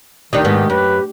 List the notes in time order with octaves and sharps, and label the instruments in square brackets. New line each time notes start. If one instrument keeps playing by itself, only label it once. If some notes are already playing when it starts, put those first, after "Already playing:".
[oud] D2 D4 D#4 [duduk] D#3 [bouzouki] G4
[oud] G#2 B3
[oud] F#2 [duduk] B4